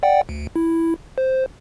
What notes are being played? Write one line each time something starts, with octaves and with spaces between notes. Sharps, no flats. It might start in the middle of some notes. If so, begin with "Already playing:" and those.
D5 F#5 G5
D2
E4
C5